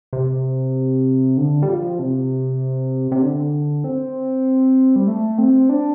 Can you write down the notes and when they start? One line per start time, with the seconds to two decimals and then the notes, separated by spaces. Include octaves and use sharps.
0.13 C3
1.37 D3
1.62 G3
1.68 F3
1.99 C3
3.12 C3
3.22 D3
3.84 C4
4.96 G3
5.08 A3
5.38 C4
5.69 D4